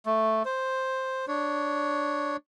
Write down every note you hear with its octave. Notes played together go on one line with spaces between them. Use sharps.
A3
C5
D4 C#5